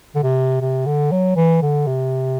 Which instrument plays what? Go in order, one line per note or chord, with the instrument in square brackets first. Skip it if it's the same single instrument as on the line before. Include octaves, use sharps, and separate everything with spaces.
[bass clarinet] D3
C3
C3
D3
F#3
E3
D3
C3